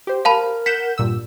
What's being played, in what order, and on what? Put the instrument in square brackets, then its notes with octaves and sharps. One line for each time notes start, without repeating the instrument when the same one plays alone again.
[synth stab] G4 C5
[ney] A#4 [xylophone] F5 A5 B5
[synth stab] F#5 G6 E7 [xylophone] B6
[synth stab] G2 A#2 E6